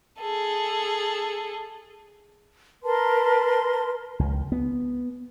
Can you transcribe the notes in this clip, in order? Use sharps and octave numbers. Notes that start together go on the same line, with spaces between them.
G#4 A4
A#4 B4 A5 C6
C#2
B3